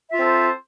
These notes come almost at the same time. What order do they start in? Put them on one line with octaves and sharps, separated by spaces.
E5 F4 C4 A4 C5